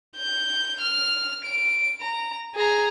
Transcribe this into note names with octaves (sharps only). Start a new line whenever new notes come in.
G6
F6
D7
A#5
G#4 A#5